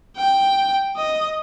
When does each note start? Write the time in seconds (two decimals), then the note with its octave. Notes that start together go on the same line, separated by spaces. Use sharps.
0.17 G5
0.96 D#5